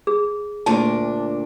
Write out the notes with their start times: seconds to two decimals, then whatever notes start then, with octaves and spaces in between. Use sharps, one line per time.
0.07 G#4
0.66 D2 A#2 D4 A5